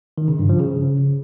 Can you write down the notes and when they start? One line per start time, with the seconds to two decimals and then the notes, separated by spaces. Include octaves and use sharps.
0.18 D#3
0.28 C#3
0.39 G2
0.49 F3
0.60 C#3